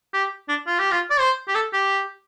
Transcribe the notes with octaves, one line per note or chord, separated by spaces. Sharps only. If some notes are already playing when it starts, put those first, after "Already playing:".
G4
D4
F4
G4
F4
D5
C5
G4
A4
G4